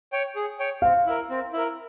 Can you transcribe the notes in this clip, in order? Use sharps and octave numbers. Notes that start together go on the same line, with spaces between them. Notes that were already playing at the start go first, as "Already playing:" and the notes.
C#5 G5
G#4
C#5 G5
C4 F5
E4 A#4
C4
E4 A#4